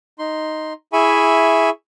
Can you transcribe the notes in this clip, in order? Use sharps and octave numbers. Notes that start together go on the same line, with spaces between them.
D#4 C6
E4 G#4 E5 G#5 B5 C#6